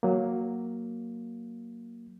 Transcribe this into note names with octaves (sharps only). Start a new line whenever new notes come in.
F#3 A#3